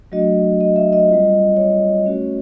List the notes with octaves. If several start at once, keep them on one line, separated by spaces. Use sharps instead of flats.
F#3 A3 D4 F#4 D#5
D#5
E5
D#5
G3 C4 F4
C#5
A3 C#4 F#4